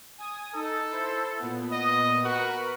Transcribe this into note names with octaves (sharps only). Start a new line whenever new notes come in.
G#5 D#6
D#4 A4
E4 C5
A#2 B3
D#5
F#4 A#4 B4 F#6